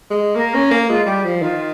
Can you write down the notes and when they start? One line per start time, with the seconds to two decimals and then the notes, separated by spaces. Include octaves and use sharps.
0.10 G#3
0.35 A#3 A#4
0.54 C#4
0.71 A#3
0.89 G#3 F4
1.06 G3 G4
1.24 F3
1.42 D#3 F4